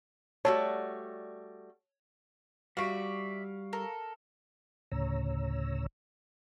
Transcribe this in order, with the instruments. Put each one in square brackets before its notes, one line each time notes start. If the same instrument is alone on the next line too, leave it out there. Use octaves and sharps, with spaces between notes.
[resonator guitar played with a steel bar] G3 A3 F#4 [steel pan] C#5 A5
[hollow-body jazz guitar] G3 F#4 [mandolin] D5 E5 [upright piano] F5 C#6 D7
[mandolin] A4 A#4
[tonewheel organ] D2 A2 C#3 C#5 A#5 E6